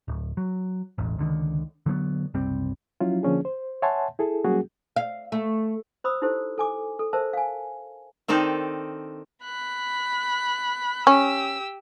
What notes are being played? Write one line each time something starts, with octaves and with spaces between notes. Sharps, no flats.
D1
F#3
E1 A1
C#2 D3 D#3
D3 F#3 A3 B3
F#1 C2 G3 C4
F3 F#3 C#4 E4 F4
D3 F3 A#3 C#4 D4 G#4
C5
C#5 E5 F#5 G#5 A5 C6
E4 G#4 A4
F#3 G3 A#3 C#4 F#4 G#4
F5
A3
C5 B5 D#6 E6
D#4 E4 G4 A4 C5
A4 G#5 D6
A4
A#4 C5 E5 A5
F5 G#5
D#3 C4 D4 D#4 A4
B5 F#6
C#4 G4 E6